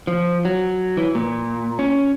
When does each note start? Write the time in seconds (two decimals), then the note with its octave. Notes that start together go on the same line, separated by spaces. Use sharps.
0.07 F3
0.45 F#3
0.97 E3
1.15 A#2
1.79 C#4